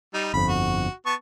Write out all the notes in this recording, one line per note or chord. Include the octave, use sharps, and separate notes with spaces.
G3 D#4
G1 F2 B5
F#4
B3 A5 C#6